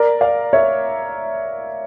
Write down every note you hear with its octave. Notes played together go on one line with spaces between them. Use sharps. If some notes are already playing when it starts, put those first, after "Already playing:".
Already playing: A#4 D5
D5 F5
C#5 E5